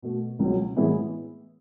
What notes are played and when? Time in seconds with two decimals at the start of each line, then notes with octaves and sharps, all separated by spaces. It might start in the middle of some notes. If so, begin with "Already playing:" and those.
0.02 B2 A3
0.39 C#2 B2 F#3
0.77 A2 E3 G#3 B3 E4